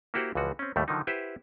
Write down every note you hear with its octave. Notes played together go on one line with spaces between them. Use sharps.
A#3 E4 F#4 G4 C5 F#5
C#2 E3 F3 F#4
C4 C#4
D#2 A2 G3 A3
D3 D#3 F3 F#3 D#4
E4 G4 B4 C5 E5 F#5